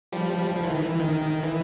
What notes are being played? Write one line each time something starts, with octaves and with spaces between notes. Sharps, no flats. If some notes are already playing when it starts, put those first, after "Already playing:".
F3 G3
F3
E3
D#3
E3
D#3
E3